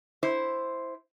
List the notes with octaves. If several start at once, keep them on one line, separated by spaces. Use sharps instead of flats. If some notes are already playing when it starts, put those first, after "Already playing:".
E4 C5